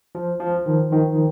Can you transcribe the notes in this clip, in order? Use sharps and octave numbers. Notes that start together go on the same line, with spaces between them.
F3
F3
D#3
D#3